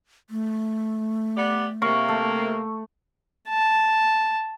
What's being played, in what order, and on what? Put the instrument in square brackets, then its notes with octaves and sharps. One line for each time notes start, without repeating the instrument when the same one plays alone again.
[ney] A3
[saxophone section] B3 G4 D5
[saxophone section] C3 A#3 [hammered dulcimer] C#6
[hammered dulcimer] A3
[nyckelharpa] A5